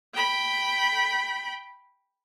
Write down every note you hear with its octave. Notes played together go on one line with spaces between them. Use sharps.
G5 B5